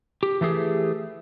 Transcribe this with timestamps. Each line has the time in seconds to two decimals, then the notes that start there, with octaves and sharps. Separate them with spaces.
0.23 G4
0.41 E3 A3 G4 G#4